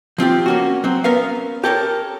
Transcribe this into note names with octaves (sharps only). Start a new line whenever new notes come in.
F3 C4 F4 G4
A#3 C#4 F#4
F#3 C4
B3 C#4 A#4 B4 F5
G4 A4 A#4 C#5